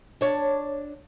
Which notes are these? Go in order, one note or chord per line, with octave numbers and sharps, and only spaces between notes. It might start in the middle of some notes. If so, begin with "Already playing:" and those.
D4 C#5